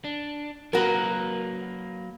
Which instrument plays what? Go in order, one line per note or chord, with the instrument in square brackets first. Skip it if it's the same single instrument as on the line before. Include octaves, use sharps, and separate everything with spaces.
[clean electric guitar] D4
[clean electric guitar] F#3 A#3 B4 [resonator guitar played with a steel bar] F#4 A#4